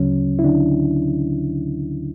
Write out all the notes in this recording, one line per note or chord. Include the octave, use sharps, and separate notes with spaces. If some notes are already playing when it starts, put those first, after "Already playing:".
Already playing: D2 C#3 F#3 C#4
E4
D3 D4